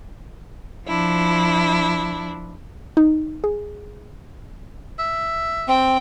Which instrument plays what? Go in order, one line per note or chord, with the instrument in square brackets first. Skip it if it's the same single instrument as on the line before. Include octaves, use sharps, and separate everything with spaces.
[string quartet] F3 D4 E4
[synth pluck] D#4
G#4
[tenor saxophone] E5
[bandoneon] C4 [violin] G5